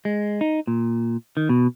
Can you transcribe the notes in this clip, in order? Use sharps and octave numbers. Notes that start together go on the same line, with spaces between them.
G#3
D#4
A#2
D#3
B2